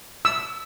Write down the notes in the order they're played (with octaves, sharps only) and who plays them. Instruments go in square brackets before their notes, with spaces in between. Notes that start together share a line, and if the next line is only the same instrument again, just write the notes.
[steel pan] E6